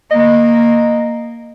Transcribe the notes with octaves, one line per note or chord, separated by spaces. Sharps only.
A#3 D#5